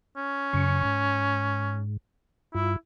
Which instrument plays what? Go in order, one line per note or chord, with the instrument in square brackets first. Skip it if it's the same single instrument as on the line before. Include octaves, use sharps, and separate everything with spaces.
[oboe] C#4
[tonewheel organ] F#2 C#3 C#6
G#2
[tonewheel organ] G2 F4 [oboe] E4